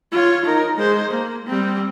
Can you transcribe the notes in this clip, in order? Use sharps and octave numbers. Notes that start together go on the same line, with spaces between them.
F4 C#5
D#4 A#4
G#3 C5
A#3
G3 C4